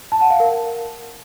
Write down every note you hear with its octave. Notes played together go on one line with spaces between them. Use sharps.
A5
F#5
F5
A#4